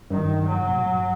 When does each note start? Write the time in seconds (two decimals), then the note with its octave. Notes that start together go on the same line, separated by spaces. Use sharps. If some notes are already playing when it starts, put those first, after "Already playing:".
0.10 G2 D#3
0.46 F#3
0.60 C3
0.67 A#2
0.75 A2
0.82 G2